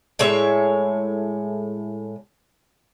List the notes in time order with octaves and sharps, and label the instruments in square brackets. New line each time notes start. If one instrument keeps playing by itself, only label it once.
[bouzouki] A2 G#3 C#5 E5